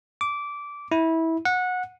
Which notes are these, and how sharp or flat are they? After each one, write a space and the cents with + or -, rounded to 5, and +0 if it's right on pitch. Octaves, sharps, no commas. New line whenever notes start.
D6 -15
E4 -20
F#5 -20